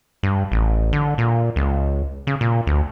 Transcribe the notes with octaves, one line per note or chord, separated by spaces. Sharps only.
G2
A1
D3
A#2
C#2
C#3
A#2
D2